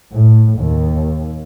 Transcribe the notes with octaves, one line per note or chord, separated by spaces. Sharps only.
A2
D#2